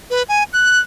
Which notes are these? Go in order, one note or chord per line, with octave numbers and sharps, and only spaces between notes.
B4
G#5
F#6